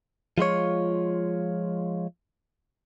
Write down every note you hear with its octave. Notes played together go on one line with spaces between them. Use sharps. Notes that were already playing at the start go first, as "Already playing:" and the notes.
F3 G#3 F4 C#5